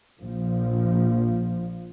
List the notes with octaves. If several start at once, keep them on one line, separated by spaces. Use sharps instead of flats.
A#1 F3